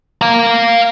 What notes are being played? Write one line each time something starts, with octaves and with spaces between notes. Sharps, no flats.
F5 A#5